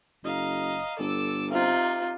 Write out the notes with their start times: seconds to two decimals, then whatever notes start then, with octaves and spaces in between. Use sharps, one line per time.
0.24 F#1 D#5 F5 A#5
1.00 G1 A4 D6 E6
1.53 C3 C4 D#4 F4